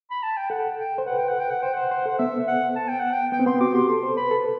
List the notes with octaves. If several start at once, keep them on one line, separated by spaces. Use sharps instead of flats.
B5
A5
G5
A4 F#5
G5
C5
B4 F#5
G5
F#5
G5
F#5
C5 G5
C5 F#5
C5
A4 F#5
B3 E5
F#5
A5
G5
F#5
G5
B3 G5
C4
B3 C6
F#4 D6
G4 C6
A4 C6
C5
B4 B5
A4